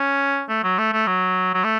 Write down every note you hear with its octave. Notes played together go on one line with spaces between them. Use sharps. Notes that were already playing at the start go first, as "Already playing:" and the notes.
Already playing: C#4
A3
F#3
A3
A3
F#3
F#3
A3